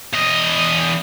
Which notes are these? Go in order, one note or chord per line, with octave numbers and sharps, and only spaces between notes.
E2 D#5